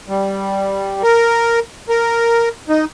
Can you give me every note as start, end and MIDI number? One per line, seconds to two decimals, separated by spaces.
0.08 1.02 55
1.03 1.60 70
1.89 2.49 70
2.69 2.85 63